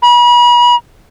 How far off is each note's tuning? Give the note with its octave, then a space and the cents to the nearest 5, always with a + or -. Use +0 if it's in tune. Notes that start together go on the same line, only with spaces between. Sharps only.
B5 -40